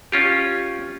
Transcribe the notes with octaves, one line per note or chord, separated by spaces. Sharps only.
C#4 F4 G4